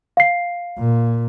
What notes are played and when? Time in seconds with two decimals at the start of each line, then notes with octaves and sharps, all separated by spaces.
0.17 F5 C7
0.78 A#2